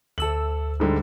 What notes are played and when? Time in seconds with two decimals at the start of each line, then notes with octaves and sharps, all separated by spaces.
0.18 D2 A4 E6 F#7
0.80 G#2 D3 G3